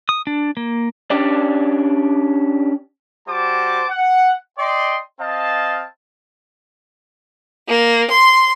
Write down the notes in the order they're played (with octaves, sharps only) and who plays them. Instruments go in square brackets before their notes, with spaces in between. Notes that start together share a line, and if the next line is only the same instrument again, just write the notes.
[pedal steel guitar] D#6
D4
A#3
[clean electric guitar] C#4 D4 G4 D5
[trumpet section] G3 F#4 C5 A5 D6
F#5
D5 D#5 G5 C6
C4 D#5 F5 A5
[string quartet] A#3
C6